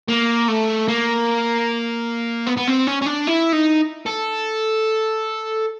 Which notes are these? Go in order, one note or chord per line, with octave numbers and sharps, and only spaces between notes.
A#3
A3
A#3
B3
B3
C4
C#4
C#4
D4
E4
D#4
A4